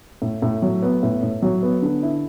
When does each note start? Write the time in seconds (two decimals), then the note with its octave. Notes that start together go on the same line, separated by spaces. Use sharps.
0.22 A2
0.42 A2
0.62 F#3
0.83 B3
1.03 A2
1.23 A2
1.42 F#3
1.63 B3
1.82 D3
2.03 E4